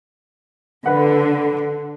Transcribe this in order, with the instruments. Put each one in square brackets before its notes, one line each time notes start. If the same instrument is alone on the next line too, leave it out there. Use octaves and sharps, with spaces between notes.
[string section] D3 [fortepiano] B4 F#5